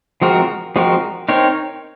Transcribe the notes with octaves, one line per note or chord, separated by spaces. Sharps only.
F3 G#3 C4 F#4 A#4
F3 G#3 C4 F#4 A#4
C4 D#4 A#4 C#5